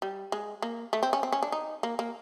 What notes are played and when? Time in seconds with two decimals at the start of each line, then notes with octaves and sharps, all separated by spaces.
0.02 G3
0.32 G#3
0.62 A#3
0.93 A3
1.03 C4
1.13 C#4
1.23 C4
1.33 C#4
1.43 D4
1.52 D#4
1.83 A#3
1.99 A#3